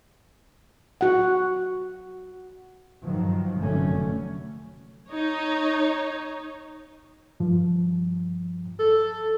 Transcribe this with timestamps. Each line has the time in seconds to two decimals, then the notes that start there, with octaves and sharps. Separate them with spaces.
1.01 F#4 F#5
3.02 G2 D#3 F3 F#3
3.59 F1 F#2 D3 F#3 A3 C#4
5.08 D#4 C#5
7.40 G2 F3
8.79 A4